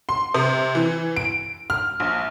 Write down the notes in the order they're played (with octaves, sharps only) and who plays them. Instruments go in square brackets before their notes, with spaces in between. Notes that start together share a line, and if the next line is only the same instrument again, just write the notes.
[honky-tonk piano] C6
C3
E3
D7
F6
A#1